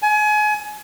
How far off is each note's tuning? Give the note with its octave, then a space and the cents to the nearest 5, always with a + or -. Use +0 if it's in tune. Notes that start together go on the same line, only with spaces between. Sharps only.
G#5 +30